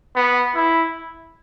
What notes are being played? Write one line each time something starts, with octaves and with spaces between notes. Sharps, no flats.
B3
E4